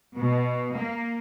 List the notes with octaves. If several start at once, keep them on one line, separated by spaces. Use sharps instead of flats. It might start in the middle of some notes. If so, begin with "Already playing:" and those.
B2
A#3